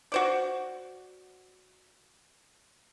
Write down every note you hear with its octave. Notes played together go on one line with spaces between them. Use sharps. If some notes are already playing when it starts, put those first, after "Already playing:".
F#4 C5 D5